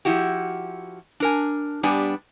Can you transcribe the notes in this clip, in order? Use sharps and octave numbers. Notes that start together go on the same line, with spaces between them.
F3 E4 F#4 G4
D4 A#4 G#5
G2 G3 B3 D4 G4 G#5